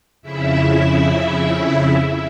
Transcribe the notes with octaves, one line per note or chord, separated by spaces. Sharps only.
F2 C#3 E4 E5